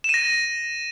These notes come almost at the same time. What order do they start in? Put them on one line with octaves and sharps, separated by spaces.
E7 D#7 A#6